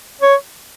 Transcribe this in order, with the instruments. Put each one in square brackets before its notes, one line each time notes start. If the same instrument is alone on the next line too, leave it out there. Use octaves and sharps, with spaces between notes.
[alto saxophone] C#5